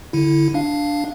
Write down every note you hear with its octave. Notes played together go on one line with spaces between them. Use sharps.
D3 E4
D4 F5